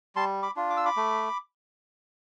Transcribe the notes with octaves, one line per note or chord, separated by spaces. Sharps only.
G3 A5 C6
B5 D6
D4 F4
D6
E6
B5 D6
A3